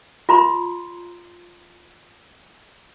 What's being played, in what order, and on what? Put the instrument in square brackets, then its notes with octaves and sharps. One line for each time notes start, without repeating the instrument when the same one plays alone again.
[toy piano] F4 A#5 C6